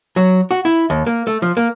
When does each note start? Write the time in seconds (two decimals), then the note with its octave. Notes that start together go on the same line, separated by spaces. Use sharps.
0.16 F#3
0.51 F#4
0.65 E4
0.90 D#2
1.07 A#3
1.27 A3
1.42 F3
1.57 A#3